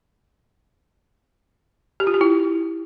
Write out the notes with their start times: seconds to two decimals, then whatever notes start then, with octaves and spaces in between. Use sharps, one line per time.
2.00 G4
2.07 F4
2.14 G4
2.21 E4